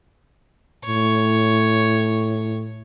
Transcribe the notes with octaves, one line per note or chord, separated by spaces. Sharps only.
A2 C#5